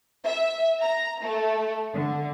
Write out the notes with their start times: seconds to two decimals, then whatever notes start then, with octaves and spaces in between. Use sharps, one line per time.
0.25 E5
0.81 A#5
1.23 A3
1.94 D3